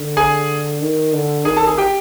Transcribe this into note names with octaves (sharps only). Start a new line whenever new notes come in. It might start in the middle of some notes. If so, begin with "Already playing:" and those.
Already playing: D3
G#4 G#5
D#3
D3
D#3 G#4 G#5
A4 A5
G#4 G#5
G4 G5